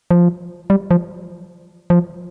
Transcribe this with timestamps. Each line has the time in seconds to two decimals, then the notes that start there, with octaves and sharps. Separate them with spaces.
0.11 F3
0.70 G3
0.91 F3
1.90 F3